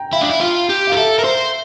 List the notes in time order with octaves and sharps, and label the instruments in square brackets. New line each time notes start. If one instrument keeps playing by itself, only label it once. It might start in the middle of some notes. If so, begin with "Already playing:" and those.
Already playing: [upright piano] G5 A#5
[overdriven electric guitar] E4 [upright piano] F5
[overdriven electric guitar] D4
E4
F4
G4
[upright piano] F5
[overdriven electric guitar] A#4
[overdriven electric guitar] A4 [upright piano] E5
[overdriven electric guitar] A#4
C5